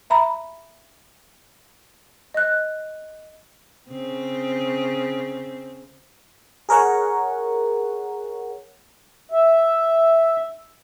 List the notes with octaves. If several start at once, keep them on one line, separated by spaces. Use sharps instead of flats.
E5 A#5 B5
D#5 F#6
C#3 C4
G#4 A#4 C#5 F#5
E5